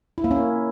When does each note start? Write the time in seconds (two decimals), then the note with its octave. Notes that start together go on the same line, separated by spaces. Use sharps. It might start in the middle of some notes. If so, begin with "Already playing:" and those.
0.18 E4
0.24 A#3
0.31 C#4